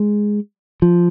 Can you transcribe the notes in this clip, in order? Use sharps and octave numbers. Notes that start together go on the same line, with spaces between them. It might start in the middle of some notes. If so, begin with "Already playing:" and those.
Already playing: G#3
F3